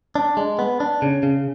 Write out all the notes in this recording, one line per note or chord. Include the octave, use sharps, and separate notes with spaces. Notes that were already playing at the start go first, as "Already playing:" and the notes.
D4
G#3
B3
D4
C#3
C#3